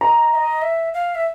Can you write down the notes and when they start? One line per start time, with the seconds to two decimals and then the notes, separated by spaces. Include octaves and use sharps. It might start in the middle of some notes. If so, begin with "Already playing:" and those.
0.01 D#5 A#5
0.32 E5
0.35 D#5
0.62 E5
0.94 F5
1.15 E5